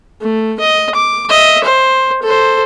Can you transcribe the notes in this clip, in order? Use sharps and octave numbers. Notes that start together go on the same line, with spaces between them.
A3
D#5
D6
D#5 E5
C5
A4 C5